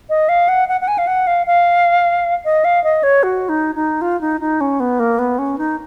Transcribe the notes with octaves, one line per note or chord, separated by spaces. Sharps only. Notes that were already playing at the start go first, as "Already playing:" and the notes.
D#5
F5
F#5
F#5
F#5
G#5
F5
F#5
F5
F5
D#5
F5
D#5
C#5
F#4
D#4
D#4
F4
D#4
D#4
C#4
B3
A#3
B3
C#4
D#4